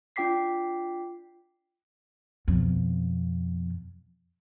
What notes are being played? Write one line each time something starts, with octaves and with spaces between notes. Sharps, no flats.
D4 F4 G5 D6 B6 C7
F2 B2